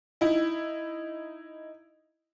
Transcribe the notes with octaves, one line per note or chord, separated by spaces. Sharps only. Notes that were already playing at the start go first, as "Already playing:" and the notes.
D#4 E4